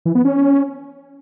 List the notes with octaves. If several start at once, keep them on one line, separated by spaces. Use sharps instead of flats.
E3
B3
C#4